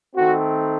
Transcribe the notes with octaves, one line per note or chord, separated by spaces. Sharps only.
D#3 A3 C4 F#4